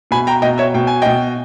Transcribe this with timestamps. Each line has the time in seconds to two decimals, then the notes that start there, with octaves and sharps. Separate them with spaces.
0.11 B2 G#5 B5
0.27 G5 A#5
0.42 B2 D#5 G5
0.58 C#5 E5
0.74 B2 G5
0.87 G#5
1.02 B2 D#5 G5